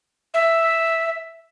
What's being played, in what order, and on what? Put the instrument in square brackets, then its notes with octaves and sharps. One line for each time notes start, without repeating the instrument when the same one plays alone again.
[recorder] E5